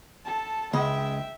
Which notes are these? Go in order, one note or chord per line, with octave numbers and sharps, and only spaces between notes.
A4 A5
C#2 G#3 E5 G5